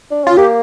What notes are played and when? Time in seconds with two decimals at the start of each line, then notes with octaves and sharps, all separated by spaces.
0.11 D4
0.24 C#4 F4
0.37 A#3 G4